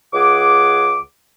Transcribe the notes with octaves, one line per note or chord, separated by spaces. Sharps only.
C#2 G#4 F#5 D6